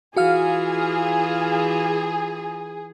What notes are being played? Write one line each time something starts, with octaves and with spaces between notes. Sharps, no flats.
E3 F4 F#4 G#4 F5 F6